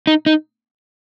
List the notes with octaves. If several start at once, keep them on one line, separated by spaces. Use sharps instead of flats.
D#4
D#4